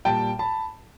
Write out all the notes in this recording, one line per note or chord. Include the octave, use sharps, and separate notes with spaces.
A#2 G3 G5 A5
A5 B5